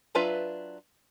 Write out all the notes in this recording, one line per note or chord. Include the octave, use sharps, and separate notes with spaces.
F#3 D4 F4 B4 E5